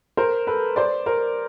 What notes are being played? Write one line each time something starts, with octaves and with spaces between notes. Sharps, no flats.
A#4 C5
A4 B4
C5 D5
A#4 C5